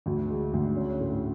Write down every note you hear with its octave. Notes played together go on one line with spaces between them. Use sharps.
D2
G#3
D2
C#4
A2